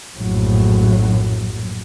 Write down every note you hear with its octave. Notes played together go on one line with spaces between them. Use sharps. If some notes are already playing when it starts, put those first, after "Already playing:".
A#1 F#2 A2 F#3